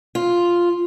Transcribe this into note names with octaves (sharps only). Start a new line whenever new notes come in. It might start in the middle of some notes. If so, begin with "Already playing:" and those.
F4